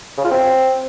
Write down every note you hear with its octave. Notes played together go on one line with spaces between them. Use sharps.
C#3
F4
C4